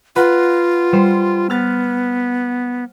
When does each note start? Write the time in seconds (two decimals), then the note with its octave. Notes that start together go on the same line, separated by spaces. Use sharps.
0.16 F4 B4 F#5 A#5
0.92 G3 C5
1.50 B3 F6 F#6 A6